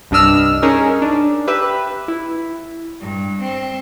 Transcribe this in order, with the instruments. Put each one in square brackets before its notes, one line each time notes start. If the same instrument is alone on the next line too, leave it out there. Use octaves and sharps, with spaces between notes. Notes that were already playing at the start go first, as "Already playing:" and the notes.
[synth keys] C2 G2 D4 D#5 E6 F6
C#4 D#4 G#4 A#4
D4
G4 B4 E5
E4
[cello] G2
C4